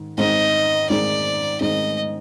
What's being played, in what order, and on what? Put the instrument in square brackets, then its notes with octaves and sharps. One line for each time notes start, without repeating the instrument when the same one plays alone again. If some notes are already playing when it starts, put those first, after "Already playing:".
Already playing: [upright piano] G#2 D#3
[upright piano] G#2 D#3 G#3 C4 D#4 [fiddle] D#5
[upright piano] G#2 D#3 G#3 C4 D#4 [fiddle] D5
[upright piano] G#2 D#3 G#3 C4 D#4 [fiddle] D#5